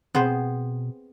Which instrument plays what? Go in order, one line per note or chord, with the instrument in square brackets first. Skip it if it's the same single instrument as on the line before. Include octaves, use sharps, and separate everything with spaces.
[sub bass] B2 [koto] B3 C5 [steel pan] C4 G#4